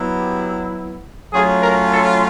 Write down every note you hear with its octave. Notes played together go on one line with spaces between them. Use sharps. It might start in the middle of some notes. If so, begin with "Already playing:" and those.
Already playing: F#3 B3 E4
G4
F#3 A3 C#4 F4 G#4
A#4
A4